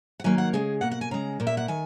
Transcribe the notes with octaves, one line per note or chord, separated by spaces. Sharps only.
F#5
D#3 F#3 A#3 G#5
F#5
C#3 G#3 G#4
B2 A#3 F#5
F#5
G#5
C#3 G#3 A#5
A#2 A#3
E5
F#5
D#3 G#5